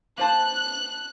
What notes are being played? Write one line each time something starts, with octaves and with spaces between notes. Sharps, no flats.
A#3 C5 A5 F#6